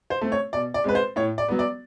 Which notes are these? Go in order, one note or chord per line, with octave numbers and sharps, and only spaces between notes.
C5
A3 C4
C#5
B2 D5
D5
G#3 C4 B4
C5
A2 C#5
D5
F#3 B3
D5